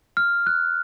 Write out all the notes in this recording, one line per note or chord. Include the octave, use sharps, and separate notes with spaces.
F6
F#6